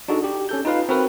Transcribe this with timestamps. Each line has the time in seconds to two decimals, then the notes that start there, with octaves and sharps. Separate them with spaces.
0.08 D4 D#4 F#4 G#4 A4
0.24 G4
0.49 C#4 A4 G6
0.65 D#4 F4 B4 F5
0.89 C4 F#4 A#4 B4